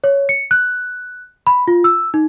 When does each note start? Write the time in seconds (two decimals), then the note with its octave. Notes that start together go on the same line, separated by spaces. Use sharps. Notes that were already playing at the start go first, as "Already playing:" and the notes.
0.04 C#5
0.29 C#7
0.51 F#6
1.47 B5
1.68 F4
1.84 E6
2.14 D#4